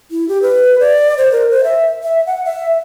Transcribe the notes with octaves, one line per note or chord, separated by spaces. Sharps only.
E4
G4
B4
D5
C5
A#4
C5
E5
E5
F#5
E5